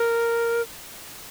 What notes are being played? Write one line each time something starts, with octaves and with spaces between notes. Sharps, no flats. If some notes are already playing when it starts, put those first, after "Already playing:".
Already playing: A#4